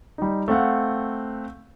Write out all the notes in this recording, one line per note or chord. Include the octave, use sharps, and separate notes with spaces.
G3 D#4
A3 C4 F5 F#5